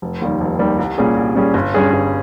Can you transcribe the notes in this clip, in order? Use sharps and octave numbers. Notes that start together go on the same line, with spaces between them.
F1
D#2 D#3 G3
F1
D#2 D#3 G3
C2
A#2 G3 C#4 G#4
C2
A#2 G3 C#4 G#4
G1
G2 G3 C#4 G#4
G1